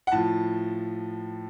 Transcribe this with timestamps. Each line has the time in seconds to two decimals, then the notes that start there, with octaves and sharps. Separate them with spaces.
0.07 F#5
0.12 A2 F3 A5